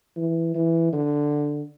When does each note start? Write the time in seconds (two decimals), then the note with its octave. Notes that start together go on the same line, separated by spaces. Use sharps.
0.16 E3
0.55 E3
0.93 D3